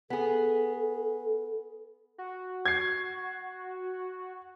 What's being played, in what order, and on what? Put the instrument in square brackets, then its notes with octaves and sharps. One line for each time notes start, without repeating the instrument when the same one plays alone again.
[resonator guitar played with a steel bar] B3 G#4 [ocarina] A4
[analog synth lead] F#4
[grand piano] G#6 C7